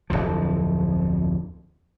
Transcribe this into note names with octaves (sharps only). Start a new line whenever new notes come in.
D1 C2 F2 F3